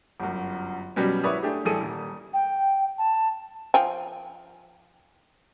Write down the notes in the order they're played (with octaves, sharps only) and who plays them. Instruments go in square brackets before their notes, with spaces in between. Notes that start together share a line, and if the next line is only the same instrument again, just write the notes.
[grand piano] G1 F#2
B2 F#3 G3 B3 C#4
G#1 E4 B4 C#5 D5 D#6
A3 D4 G4 G#4
A1 G3 G#4 A4 D#6 D#7
D#1
[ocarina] G5
A5
[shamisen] F3 G5 G#5